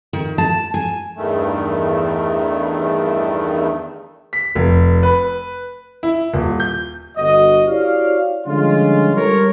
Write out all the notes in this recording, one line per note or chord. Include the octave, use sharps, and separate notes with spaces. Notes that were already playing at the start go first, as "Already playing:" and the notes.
D#3
A5
G#5
E2 G2 D#3 A3
B6
F1
B4
E4
D#1
G6
G1 F#4 D#5
E4 F#4 G4 C#5 D5 F5
D3 F3 G3 G#3 C#4 F4
G3 A4 A#4 C#5